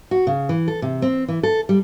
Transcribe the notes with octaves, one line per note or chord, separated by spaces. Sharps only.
F#4
C#3
E3
A4
C3
C4
E3
A4
G3